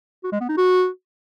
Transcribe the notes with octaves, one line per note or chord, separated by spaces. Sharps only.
F#4
G#3
B3
D#4
F#4